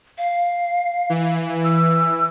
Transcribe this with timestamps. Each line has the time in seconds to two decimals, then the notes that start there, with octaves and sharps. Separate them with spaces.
0.18 F5
1.10 E3
1.64 E6